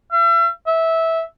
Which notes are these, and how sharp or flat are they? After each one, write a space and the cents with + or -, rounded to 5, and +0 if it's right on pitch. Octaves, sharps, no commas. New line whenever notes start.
E5 +40
E5 -15